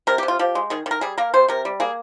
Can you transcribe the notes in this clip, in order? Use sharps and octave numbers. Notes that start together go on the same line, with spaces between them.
C3 A#4
G4
C3
F4
F3 G4
G#3
D#3 G#4
D#3
A#4
G3 G#4
A#3 A#4
C3 C5
C3 A#4
G3
A#3 G#4